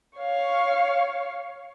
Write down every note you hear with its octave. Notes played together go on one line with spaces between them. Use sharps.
C#5 F5